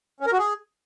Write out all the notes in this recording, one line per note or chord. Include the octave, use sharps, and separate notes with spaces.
C#4
A#4
F#4
G#4